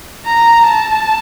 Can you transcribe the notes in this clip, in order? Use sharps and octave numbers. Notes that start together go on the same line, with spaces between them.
A#5
A5